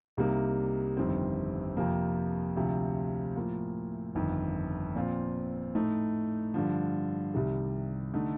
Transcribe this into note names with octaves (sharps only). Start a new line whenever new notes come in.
C2 C3 G3 A#3 D#4
G1 F2 D#3 G3 C4
F2 C3 F3 A#3
D2 C3 F3
A2 F3 A#3 F4
G1 F2 D#3
A#2 F3 C4 F4
A2 A3 D#4
G2 D3 F3
C2 C3 D#3 G3
D3 A3 D#4